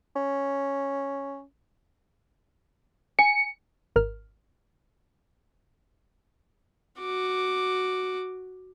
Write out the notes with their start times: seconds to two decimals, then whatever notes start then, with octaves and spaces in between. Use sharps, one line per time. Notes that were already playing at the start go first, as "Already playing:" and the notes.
0.16 C#4
3.19 G#5 C#7
3.96 G#1 A#4 F6
7.00 F#4 D6